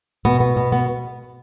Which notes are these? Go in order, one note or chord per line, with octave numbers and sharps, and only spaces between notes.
B2 B3
B3
B2
B3